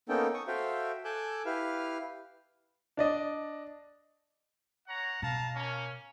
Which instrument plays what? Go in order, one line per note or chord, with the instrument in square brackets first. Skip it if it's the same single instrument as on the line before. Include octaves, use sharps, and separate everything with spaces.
[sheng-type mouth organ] A#3 B3 C#4 D#4 A4 G5
C#6 D#6
F#4 A4 C5 E5 F5 G5
A4 G#5 D6 E6 F#6 G6
E4 G4 B4 F5 F6
[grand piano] D4 D5 D#5
[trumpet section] C#5 F#5 A#5
[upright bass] B2 [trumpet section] F5 A5 A#5
[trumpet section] A#3 C#4